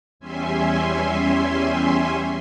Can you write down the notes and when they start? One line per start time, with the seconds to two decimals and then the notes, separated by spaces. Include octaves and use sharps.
0.20 E2 G3 C#4 E5 G#5 C6